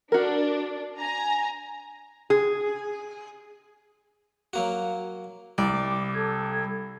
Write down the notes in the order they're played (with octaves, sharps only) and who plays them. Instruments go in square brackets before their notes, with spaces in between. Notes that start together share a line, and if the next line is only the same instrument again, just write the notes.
[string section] D4 [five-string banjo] F#4 A#4
[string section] G#5 A#5
[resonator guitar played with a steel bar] G#4
[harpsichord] F#3 A#3 F#4
[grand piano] C2 [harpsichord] D5 [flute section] D6
[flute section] A4 G#6